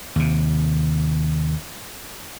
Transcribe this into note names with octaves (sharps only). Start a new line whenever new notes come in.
D#2 C3